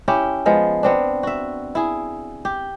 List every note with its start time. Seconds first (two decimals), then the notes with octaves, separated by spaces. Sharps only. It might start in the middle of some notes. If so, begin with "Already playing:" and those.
0.08 C#4 E4 G4
0.46 F3 G#3 B3
0.83 B3 C4 D4
1.23 F#4 E5
1.75 E4 G#4
2.45 G4